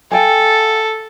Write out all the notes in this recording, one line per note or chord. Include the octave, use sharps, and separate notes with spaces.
A4 F5 G5 G#5